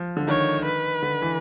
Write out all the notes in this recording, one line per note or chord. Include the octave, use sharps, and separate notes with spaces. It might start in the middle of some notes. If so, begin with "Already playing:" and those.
Already playing: F3
D3
D#3 C#5
B4
D3
E3